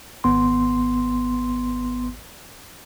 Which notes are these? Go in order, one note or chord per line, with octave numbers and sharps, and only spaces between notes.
G#1 B3 C6